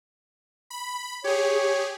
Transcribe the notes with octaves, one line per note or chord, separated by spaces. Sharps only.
B5
G4 G#4 C#5